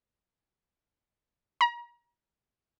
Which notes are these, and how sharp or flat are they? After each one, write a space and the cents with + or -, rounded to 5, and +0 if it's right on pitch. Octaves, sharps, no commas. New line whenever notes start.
A#5 +35